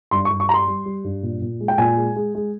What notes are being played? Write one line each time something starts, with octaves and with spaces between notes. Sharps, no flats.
G2 C6
C#6
G2
C#6
G3 A#5 C6
G3
G3
G2
A#2
A#2
G#3
G5
A#2 G#5
G#3
G#3
G#3